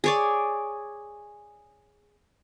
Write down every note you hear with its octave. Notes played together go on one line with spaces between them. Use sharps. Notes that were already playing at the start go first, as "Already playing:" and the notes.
G#4 C#5 D5